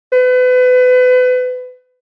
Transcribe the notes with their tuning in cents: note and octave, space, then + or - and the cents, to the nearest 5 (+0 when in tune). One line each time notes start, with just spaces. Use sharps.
B4 +30